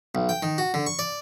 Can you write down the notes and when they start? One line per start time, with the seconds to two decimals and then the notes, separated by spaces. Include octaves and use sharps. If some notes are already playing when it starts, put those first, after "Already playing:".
0.15 B1
0.29 G5
0.43 D#3
0.58 F#4
0.74 D3
0.86 C#6
0.99 D5